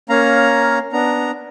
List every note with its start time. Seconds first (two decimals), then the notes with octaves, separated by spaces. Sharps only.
0.09 A#3 C#4 F5 A#5
0.93 B3 D4 A#5